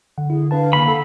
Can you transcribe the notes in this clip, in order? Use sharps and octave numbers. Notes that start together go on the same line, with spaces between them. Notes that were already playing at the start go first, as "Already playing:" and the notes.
D3 F#5
E4 G#4
D4 B4 F5 A5
C#3 A#3 B5
A4 F#5